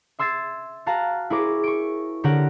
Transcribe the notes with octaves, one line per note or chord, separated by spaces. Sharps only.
E5 C6 E6 G#6 A6 C7
F#4 F5 A5 A#5 F#6
E4 G#4 A#4 C5 C#6 D6
C#6 D7
D3 G4 A#4 C#5 F#5 D7